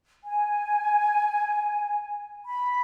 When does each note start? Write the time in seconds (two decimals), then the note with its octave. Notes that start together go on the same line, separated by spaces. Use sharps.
0.24 G#5
2.45 B5